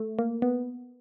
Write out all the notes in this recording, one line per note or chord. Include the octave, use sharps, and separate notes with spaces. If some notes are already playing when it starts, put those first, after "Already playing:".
Already playing: A3
A#3
B3